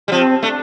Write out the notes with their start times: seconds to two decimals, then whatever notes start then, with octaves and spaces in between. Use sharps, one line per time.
0.08 G3
0.12 F3 C4
0.42 A3 D4